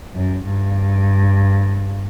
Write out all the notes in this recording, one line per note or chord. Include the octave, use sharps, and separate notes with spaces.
F#2
G2